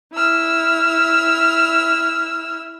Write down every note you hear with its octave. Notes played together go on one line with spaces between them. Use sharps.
E4 E6 F6